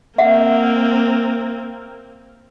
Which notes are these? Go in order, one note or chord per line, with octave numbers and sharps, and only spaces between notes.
A#3 C4 E5 F#5